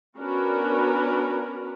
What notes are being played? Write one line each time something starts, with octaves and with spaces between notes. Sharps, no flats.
B3 C#4 D4 F#4 A#4 B4